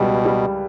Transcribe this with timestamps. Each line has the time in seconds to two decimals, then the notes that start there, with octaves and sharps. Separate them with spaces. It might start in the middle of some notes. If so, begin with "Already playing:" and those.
Already playing: C#2 B2 G3
0.25 G3